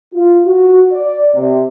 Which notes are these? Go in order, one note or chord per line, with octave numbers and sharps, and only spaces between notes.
F4
F#4
D5
C3